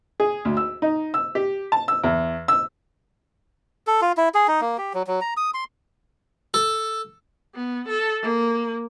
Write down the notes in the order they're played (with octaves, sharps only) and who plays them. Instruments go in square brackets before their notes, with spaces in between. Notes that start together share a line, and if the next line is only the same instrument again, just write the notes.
[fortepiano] G#4
D2
E6
D#4
E6
G4
A5
E6
E2
E6
[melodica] A4
F4
E4
G#4
D#4
A#3
G4
F#3
F#3
A#5
D#6
C6
[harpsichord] A4
[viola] B3
A4
A#3